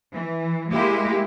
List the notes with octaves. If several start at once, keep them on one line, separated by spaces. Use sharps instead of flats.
E3
G#3 A#3 E4 G4